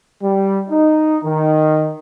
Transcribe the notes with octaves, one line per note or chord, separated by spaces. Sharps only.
G3
D#4
D#3